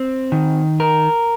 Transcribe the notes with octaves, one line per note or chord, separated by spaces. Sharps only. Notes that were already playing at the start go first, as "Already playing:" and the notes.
Already playing: C4
D#3
A#4